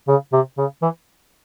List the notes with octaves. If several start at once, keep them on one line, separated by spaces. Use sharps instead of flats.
C#3
C3
C#3
E3